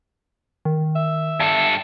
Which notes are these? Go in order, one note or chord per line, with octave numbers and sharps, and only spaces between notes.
D#3
E5
G2 A4 A5